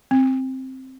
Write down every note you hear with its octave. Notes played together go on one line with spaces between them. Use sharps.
C4